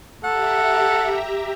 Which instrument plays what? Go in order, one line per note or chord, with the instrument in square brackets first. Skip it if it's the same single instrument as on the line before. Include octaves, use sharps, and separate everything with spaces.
[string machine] G4 E5 A#5 [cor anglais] A4 [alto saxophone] F#5